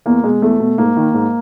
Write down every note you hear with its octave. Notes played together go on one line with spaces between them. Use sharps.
E2 A#3
B2 G#3
E2 A3
B2
G#2 A#3
D#3
G#2